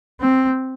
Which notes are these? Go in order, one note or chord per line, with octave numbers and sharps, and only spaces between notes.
C4